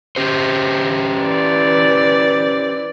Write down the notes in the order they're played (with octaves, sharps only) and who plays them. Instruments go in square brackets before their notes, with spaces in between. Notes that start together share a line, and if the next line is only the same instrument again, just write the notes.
[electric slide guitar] C#4 G4 C5
[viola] E3 D5